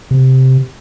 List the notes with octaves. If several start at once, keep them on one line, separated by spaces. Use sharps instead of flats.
C3